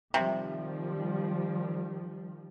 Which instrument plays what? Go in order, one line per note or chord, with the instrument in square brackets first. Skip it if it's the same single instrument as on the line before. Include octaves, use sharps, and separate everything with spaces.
[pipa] C3 [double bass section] D#3 F3 G3